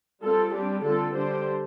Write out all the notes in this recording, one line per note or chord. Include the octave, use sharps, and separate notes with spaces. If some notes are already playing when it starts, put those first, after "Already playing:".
G3 C4 F4 A4
G3 C4 D4 G4
D3 G3 C4 F4 A4
D3 G3 D4 G4 C5